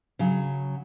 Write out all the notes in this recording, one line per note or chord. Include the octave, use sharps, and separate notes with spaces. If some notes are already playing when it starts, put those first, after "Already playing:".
C#3 F#3